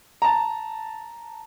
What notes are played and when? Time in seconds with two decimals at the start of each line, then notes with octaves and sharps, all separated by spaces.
0.22 A5 A#5